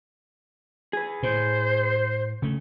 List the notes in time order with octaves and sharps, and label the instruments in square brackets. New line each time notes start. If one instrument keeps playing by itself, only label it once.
[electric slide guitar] G#4 B4
[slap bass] A2 [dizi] C5
[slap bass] C#3 A3